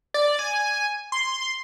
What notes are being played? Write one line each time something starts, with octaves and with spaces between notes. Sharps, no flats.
D5
G#5
C6